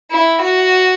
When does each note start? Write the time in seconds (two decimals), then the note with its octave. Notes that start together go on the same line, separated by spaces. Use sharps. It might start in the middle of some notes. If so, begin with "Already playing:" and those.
0.11 E4
0.42 F#4